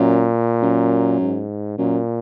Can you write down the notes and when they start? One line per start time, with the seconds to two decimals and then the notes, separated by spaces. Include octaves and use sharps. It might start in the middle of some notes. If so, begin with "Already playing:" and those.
Already playing: F#2 A#2
0.62 F#2
1.20 G#2
1.78 F#2 A#2